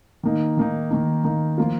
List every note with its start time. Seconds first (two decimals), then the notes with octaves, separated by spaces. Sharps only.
0.23 D#3 A#3 D#4
0.57 D#3 A#3 D#4
0.91 D#3 A#3 D#4
1.24 D#3 A#3 D#4
1.58 F3 A#3 F4